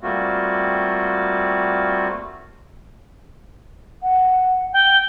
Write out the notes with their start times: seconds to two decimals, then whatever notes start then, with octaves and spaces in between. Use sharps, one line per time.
0.01 G3 A3 A#3 C4 F4 F#4
4.03 F#5
4.73 G5